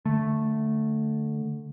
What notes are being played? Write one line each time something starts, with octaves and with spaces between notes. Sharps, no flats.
D3 A3